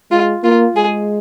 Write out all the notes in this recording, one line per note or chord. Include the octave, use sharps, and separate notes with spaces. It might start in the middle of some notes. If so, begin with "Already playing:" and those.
G#3 F4
A#3 F4
G#3 G#4